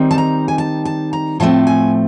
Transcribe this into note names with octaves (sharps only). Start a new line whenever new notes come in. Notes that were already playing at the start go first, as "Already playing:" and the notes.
Already playing: D#3 G3 C4 D#4
A5
A#5
G#5
A5
A5
A#5
A2 F3 A3 C4 A5
G#5